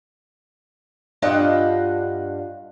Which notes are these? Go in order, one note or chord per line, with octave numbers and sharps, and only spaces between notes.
G2 D4 F4 D#5 F#5 G5